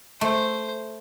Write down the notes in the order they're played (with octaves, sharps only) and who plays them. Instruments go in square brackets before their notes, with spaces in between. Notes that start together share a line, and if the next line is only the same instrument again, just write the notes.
[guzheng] A3 [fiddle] C5